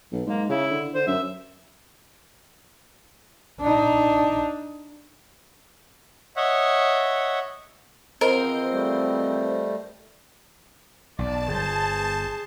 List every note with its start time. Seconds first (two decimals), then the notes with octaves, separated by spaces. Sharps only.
0.12 B1
0.26 G#2 A#3
0.49 C#3 E4
0.71 D3
0.94 D3 C5
1.07 F#2 E5
3.61 D4 D#4
6.36 C#5 D#5 E5 F#5
8.21 E2 F3 C4 A#4 C5 D#5
8.71 G3 A3
11.19 B1 D5 A5
11.48 G1 G#4 C5